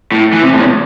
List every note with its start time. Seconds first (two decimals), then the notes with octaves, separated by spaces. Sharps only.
0.12 A2
0.33 E3
0.43 C3
0.53 A2
0.59 E2